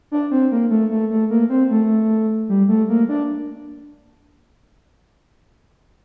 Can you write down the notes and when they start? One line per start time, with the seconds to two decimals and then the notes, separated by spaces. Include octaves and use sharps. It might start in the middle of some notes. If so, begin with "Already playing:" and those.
0.12 D4
0.31 C4
0.52 A#3
0.71 A3
0.91 A3
1.11 A3
1.30 A#3
1.50 C4
1.71 A3
2.49 G3
2.69 A3
2.89 A#3
3.09 D4